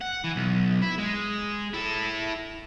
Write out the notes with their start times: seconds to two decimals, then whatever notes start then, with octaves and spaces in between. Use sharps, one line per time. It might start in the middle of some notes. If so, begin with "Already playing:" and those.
0.01 F#5
0.24 E3
0.36 B1
0.82 E4
0.99 G#3
1.73 E4 A4